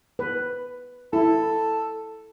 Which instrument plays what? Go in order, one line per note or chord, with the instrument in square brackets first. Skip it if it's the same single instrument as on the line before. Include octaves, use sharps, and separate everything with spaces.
[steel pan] B4
[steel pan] E4 [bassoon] A4